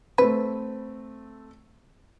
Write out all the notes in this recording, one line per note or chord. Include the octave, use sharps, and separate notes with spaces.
A3 C4 B4